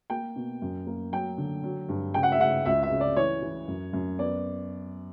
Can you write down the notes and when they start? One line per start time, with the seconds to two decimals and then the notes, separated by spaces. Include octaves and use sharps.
0.10 A#3 G5
0.36 B2
0.62 F#2
0.86 A#3
1.12 F#3 G5
1.38 D3
1.64 F#3
1.89 G2
2.14 C#3 G5
2.23 F#5
2.32 E5
2.40 C#3 F#5
2.66 C#2 E5
2.83 E5
2.91 C#3
3.00 D5
3.16 E3 C#5
3.42 E3
3.68 F#2
3.93 F#2
4.19 B3 D5